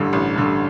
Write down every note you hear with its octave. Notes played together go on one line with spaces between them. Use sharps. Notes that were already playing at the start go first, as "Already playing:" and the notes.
Already playing: A1 G2 D3
A1
G2 D3